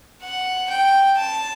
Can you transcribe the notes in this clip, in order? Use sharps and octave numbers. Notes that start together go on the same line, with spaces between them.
F#5
G5
A5